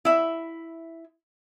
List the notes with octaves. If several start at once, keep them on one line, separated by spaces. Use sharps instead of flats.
E4 E5